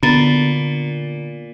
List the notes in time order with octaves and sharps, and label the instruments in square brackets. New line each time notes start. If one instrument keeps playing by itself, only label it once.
[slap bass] A#2 [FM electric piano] D3 [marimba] B3 A#5 A6